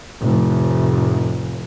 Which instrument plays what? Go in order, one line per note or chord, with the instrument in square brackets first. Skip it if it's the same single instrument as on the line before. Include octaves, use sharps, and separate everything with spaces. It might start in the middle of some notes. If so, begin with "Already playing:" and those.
[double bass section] F1 A2